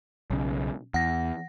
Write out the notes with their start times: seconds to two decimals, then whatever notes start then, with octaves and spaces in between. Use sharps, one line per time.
0.30 B1 C#3
0.94 E2 F#5 A#6